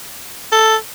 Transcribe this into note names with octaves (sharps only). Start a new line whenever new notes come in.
A4